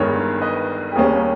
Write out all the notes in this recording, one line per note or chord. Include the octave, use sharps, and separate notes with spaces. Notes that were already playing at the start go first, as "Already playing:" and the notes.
Already playing: G1 G2 D#3 G#3 A#4 C#5
B4 D#5
G4
D#2 D#3 G3 A#3 C#4 G#4